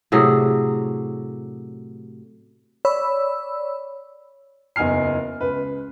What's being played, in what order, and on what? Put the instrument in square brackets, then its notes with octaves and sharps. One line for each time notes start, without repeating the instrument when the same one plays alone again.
[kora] A2 C3 F#3 G#4
[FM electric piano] C#5 D5 B5 E6
[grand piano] F#1 E2 D#4 G#5 F6 C7
C#2 B4